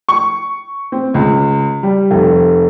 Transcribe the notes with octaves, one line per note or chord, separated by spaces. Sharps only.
C#6
C4
C#2
G3
F1